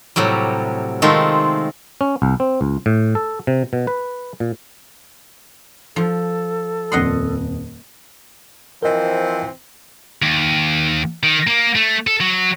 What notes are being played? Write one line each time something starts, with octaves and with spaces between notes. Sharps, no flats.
A2 C3 F#3 G3
D#3 G#3 A3 C4 F4
C#4
C2
C4
C#2
A2
A4
C3
B2
B4
A#2
F3 A4
D#1 F2 D#5 F#5 C6 D#6
E3 F3 C4 A#4 D#5
D#2
D#3
A#3
A3
A4
F#3